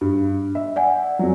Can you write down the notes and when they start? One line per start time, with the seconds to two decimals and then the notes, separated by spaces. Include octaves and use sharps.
0.01 G2
0.55 E5
0.76 D5 F#5 G#5
1.19 F2 F#3